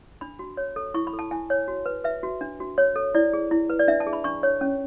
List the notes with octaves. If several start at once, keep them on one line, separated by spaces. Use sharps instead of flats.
D4 B5
F#4
C#5
A4
E4 C#6
B5
A4
A5
E4 G#5
C#5
F#4
B4
B4 E5
F#4
D4
F#4
C#5
A4
E4 D5
G#4
E4
B4
D5
D4 E5
A5
G#4
B5
D4 C#6
C#5
C#4